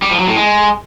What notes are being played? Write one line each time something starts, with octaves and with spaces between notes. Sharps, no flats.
G3
F3
F#3
A2
G#3